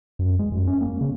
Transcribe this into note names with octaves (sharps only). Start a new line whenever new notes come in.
F#2
G#3
F#2
C#4
A#3
C#3